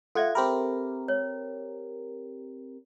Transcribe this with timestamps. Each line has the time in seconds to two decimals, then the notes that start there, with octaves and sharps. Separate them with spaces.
0.15 F4 A4 E5 F#5 G#6
0.35 C4 G4 A#4 B5 C6
1.08 C#5